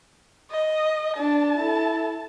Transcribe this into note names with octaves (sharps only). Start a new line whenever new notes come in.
D#5
D4 A5
E4 A4